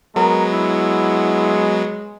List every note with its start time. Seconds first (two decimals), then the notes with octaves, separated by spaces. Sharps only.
0.16 F#3 G#3 B3 A#4
0.52 E4